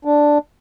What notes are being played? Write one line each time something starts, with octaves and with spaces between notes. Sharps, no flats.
D4